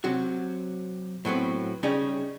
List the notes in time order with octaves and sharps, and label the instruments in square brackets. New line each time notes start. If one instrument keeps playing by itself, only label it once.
[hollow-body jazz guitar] C3 F#3 F#4
A2 F#3 B3 C4
C#3 G3 C#4 D#4 G#4